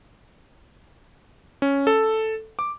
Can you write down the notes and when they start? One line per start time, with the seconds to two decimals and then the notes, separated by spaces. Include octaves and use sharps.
1.62 C#4
1.87 A4
2.59 D6